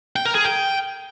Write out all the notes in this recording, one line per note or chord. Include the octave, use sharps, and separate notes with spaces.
G5
A#4
G#4
G5